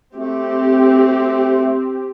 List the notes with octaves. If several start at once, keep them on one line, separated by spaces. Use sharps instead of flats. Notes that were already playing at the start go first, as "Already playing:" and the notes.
A3 C4 G4